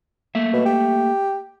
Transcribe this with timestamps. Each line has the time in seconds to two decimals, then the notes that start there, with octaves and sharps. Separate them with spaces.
0.35 A3 A#3 E5
0.53 B2
0.66 G4